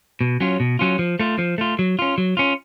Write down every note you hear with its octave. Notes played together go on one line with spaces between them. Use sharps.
B2
F#3 C#4 F4
B2
F#3 C#4 F4
F3
A3 F4
F3
A3 F4
F#3
C#4 F4
F#3
C#4 F4